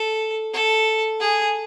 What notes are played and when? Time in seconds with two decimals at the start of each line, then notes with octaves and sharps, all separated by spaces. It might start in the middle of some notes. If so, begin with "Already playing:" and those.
Already playing: A4
0.53 A4
1.21 G#4